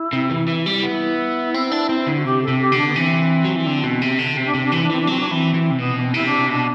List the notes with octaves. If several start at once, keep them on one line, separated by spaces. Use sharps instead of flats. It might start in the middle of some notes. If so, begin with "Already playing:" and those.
Already playing: E4
C3
E3
E3
G3
B3 E4
C4
D4
C4
D3
F#4
C3 G4
A4
C3
G4
D3
D4
B3
E3 C4
F#3
E3
D3
B2
C3
D3
C3 C4
D4
C3 C4
D4
E3 C4
D4
E3 C4
D4
F#3 C4
D4
E3 C4
E3
C3
B2 B3
D4
C4
C3 E4
D4
B2 D4